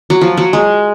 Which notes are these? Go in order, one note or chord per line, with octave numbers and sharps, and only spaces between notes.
F#3
F3
F#3
G#3